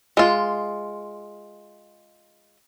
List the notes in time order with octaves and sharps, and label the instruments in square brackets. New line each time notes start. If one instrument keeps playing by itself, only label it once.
[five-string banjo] G#3 F4